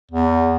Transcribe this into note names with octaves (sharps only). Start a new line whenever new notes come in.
E2